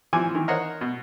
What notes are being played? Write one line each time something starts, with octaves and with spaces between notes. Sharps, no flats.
E3 F3 G#5 D6
D#3 E3
A#4 C5 C#5 D#5 F#5
B2